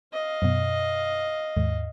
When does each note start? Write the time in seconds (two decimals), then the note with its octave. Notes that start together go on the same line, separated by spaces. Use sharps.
0.13 D#5 F5
0.42 F#2 B2
1.57 D#2 G#2